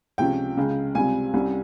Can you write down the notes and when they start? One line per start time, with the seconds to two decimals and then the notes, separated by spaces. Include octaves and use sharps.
0.18 C#2 C3 F3 G#3 C#4 G5
0.57 C#2 C#3 G#3
0.95 C#2 C3 G3 C4 G#5
1.34 C2 C3 G3 C#4